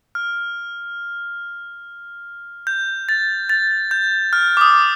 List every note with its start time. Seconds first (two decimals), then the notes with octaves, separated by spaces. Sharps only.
0.15 F6
2.67 G6
3.09 A6
3.49 A6
3.91 G6
4.33 F6
4.57 D6
4.61 D#6